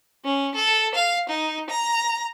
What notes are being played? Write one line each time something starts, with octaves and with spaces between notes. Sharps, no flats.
C#4
A4
F5
D#4
A#5